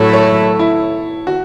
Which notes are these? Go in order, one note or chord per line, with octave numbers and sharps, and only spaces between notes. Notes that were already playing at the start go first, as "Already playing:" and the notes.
Already playing: A2 F#3 A3 E4 A4 C#5
A4 C#5
E4
F#4